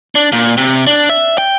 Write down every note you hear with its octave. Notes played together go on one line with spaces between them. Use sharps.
D4
A#2
C3
D4
E5
G5